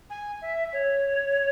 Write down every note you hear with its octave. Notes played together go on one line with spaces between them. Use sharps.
G#5
E5
C#5